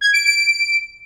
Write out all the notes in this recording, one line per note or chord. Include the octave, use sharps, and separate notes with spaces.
G#6
D7
D7